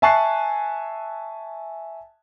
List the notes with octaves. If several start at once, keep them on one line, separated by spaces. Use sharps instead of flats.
E5 G#5 A5 C#6 F#6 C7